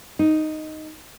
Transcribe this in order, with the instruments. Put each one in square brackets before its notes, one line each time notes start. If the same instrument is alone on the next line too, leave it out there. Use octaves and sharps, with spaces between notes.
[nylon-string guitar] D#4